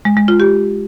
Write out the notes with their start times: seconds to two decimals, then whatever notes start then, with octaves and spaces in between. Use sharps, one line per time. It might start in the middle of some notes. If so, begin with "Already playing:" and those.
0.05 G#3
0.17 G#3
0.28 F4
0.40 G4